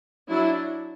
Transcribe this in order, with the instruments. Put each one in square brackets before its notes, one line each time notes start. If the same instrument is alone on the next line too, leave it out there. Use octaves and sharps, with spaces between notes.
[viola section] F#3 D4 E4